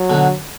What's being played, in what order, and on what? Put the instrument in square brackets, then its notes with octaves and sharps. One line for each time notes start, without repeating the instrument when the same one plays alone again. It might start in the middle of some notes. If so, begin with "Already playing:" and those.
Already playing: [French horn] F#3
[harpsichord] B2 D3